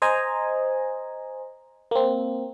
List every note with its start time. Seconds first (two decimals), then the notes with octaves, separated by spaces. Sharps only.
0.02 C5 D#5 G#5 A#5
1.91 A#3 C4